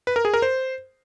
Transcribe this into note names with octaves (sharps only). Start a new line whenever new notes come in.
B4
A#4
G#4
A#4
C5